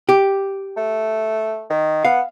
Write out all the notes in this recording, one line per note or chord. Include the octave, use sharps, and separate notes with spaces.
G4
A3
D#3
B3 F5